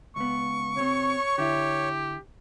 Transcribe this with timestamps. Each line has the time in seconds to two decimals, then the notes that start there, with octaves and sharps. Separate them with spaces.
0.16 C#2 B3 C#6
0.77 C3 C4 C#5
1.38 D3 E4 G4